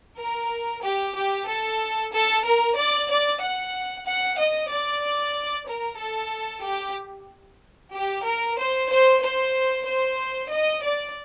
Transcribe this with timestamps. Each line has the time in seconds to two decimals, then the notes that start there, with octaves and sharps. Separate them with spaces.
0.19 A#4
0.83 G4
1.16 G4
1.49 A4
2.13 A4
2.45 A#4
2.77 D5
3.10 D5
3.41 F#5
4.06 F#5
4.38 D#5
4.70 D5
5.68 A#4
5.99 A4
6.63 G4
7.93 G4
8.24 A#4
8.58 C5
8.90 C5
9.22 C5
9.86 C5
10.51 D#5
10.82 D5